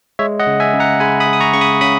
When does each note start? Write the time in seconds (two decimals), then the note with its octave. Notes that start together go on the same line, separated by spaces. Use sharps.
0.19 G#3 C#5 E5
0.40 D#5 F#5
0.47 C#3
0.60 E5 G#5
0.73 C#3
0.80 F#5 A#5
1.00 G#3 G#5 B5
1.20 B5 D#6
1.27 G#3
1.33 D#6
1.40 A#5 C#6
1.54 C#3 C#6
1.61 B5 D#6
1.81 C#3 B5 D#6